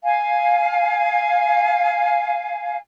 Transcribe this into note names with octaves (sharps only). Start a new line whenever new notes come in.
F5 G#5